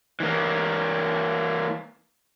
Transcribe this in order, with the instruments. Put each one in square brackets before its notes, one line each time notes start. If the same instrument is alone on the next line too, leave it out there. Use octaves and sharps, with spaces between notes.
[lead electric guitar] E3 A#3